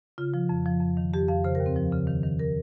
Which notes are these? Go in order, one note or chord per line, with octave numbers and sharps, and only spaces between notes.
C#3 F4
F3
F2
F3
F2
D#3
F2 G4
F2 F5
C#3 C5
A#4
D#2
C4
F3
C#3
D#3
D#3
A#4